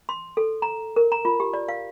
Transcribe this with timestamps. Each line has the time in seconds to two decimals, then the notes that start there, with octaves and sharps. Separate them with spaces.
0.09 C6
0.37 A4
0.62 A#5
0.96 A#4
1.12 A#5
1.25 F4
1.40 G4
1.54 D5
1.68 F5